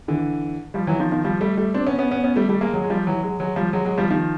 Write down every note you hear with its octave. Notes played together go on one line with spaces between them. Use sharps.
D3 E3
F3 G3
E3 F#3
D#3 F3
D#3 F3
F3 G3
G3 A3
G3 A3
C4 D4
B3 C#4
B3 C#4
B3 C#4
B3 C#4
G3 A3
G3 A3
G#3 A#3
F#3 G#3
G#3
F3 G3
E3 F#3
F#3 G#3
F#3 G#3
F3 G3
F#3 G#3
F#3 G#3
F3 G3
D#3 F3